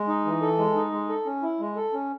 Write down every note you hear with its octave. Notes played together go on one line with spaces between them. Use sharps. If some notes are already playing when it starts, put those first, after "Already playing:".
Already playing: G#3
D#4
E3
A4
G#3
D#4
G#3
A4
C#4
E4
G#3
A4
C#4